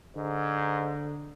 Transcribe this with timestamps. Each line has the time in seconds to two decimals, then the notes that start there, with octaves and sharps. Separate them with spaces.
0.16 G#2 D3